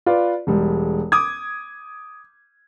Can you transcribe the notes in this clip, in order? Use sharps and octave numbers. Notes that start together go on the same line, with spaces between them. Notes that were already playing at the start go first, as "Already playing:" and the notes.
F4 B4 D5
E1 G3 G#3
D6 D#6 G#6